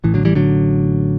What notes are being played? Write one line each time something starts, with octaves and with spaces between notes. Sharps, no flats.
A1 A2 E3
D3 F#3
E3 G3
D3 F#3